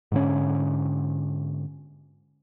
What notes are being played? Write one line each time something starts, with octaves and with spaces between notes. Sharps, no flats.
G#2 D3 C#4